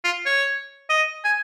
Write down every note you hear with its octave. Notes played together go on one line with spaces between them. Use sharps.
F4
C#5
D#5
G#5